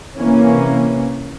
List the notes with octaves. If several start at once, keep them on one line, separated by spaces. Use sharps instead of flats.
C3 E3 A#3 C#4